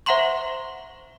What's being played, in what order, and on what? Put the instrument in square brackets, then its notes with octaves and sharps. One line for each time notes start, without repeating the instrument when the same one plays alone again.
[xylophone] C5 E5 F#5 A#5 C6 C#6